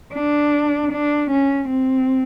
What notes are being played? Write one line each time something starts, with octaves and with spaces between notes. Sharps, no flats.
D4
D4
C#4
C4